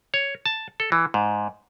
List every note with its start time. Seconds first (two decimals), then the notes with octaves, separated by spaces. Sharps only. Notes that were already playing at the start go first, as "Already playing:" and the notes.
0.14 C#5
0.46 A5
0.80 A4
0.92 E3
1.14 G#2